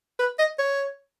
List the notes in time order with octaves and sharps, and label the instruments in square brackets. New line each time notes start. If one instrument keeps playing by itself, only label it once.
[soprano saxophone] B4
D#5
C#5